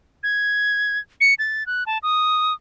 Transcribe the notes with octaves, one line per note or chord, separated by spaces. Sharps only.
G#6
C#7
A6
F#6
A5
D#6